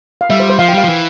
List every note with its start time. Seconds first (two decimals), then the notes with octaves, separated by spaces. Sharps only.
0.21 F5
0.30 G3 E5
0.40 C5
0.50 C5
0.59 F3 F5
0.69 G5
0.74 G3 F5
0.84 F3
0.89 E3